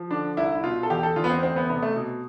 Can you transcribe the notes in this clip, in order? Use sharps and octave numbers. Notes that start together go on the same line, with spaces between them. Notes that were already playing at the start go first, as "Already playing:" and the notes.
Already playing: F3
D3 D4
C2 E4
E4
B2 F4
A4
E2 G4
A4
E2 F4
B3
C4
D2 C4
B3
C3 B3
A3
B2